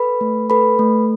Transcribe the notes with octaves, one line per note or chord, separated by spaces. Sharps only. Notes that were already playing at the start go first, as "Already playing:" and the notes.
Already playing: A4 B4 B5
A3
A4 B4 B5
A3